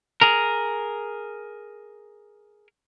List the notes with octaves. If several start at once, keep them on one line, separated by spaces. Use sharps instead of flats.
G#4 A#4